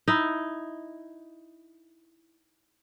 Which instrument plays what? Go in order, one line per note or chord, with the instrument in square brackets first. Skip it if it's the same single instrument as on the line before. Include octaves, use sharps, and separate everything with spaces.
[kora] D#4 E4